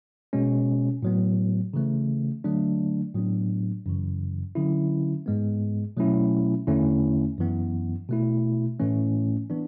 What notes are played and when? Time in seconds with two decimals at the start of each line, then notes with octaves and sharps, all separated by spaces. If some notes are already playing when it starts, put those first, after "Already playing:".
0.33 B2 G#3 C#4
1.03 A2 F#3 B3
1.74 C#3 E3 A3
2.44 D3 F#3 A3 D4
3.14 A2 F#3 B3 D4
3.86 F#2 C#3 E3
4.55 D3 F#3 C#4 E4
5.26 G#2 G#3 B3
5.97 B2 F#3 A3 C#4 E4
6.67 E2 D3 A3 C#4 E4
7.38 F#2 E3 B3
8.09 B2 A3 E4
8.79 A2 E3 A3 C#4
9.50 E3 B3 D4